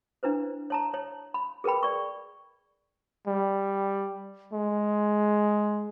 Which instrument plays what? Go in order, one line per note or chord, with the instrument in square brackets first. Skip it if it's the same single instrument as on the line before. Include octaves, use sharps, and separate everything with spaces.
[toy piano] D4 E4 B4 C5
C#5 A5 A#5
C#5
B5
G#4 A#4 B4 G5 B5
D5 C#6
[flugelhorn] G3
G#3